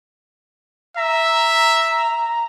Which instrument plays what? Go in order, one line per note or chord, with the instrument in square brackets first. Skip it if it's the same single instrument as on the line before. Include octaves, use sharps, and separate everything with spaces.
[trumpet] E5 [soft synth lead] A#5